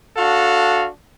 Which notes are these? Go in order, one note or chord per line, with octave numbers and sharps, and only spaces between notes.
D4 F#4 A4 F5